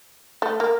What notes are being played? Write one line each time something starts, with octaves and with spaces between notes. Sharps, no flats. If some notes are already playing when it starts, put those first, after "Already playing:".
A3
A#3